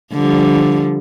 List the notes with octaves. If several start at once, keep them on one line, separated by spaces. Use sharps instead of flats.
D3 F3 G3